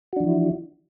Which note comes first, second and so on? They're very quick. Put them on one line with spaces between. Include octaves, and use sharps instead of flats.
F#4 D4 F3 E3 E4